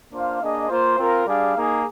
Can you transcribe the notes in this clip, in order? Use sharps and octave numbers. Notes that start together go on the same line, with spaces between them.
A#3 D4 F4 C5 F5
A#3 D4 G#4 D#5
A#3 F4 C5
C4 F4 A#4 F5
G3 D4 G#4 D5 F5
A#3 D#4 G#4